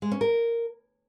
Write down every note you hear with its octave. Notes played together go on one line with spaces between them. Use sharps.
G#3
C#4
A#4